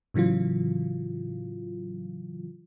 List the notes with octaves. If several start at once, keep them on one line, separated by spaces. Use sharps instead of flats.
A2 C#3 E3 F#3 F4